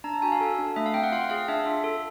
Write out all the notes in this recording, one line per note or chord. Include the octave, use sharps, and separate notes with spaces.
D4 A#5
A5
F#4 G#5
F5
A4
D4
A3 E5
F5
C4 G5
F#5
F4 F5
F#5
G#4 F5
D4 E5
F4
A4